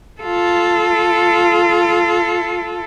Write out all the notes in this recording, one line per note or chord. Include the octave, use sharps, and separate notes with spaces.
F4 A4